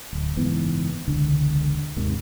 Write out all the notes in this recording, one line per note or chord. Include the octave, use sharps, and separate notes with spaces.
D1
F#1 G#2 E3 B3
E1 C#2 D3
D#2 G#2 C3 D#3